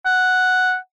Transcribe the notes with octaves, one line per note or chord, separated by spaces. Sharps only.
F#5